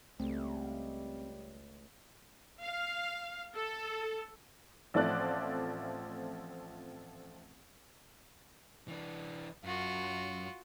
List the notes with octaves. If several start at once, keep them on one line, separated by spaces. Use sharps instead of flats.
C#2 G3 A3 C4
F5
A4
A1 F3 A3 C4 D5 F#6
E3 D4
F#2 F4 F#4